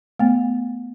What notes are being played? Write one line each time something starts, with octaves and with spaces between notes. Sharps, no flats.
A3 B3